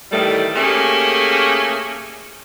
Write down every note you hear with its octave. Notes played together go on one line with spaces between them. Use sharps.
A2 D#3 E3 G3 A3
A3 A#3 C#4 G4 G#4